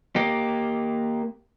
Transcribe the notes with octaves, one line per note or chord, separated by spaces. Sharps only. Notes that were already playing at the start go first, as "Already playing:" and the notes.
A#3 G4